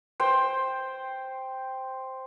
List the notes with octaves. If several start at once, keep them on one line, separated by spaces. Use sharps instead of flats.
C5 G5